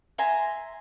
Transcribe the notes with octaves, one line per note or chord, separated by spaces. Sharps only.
E5 G#5 A#5 C6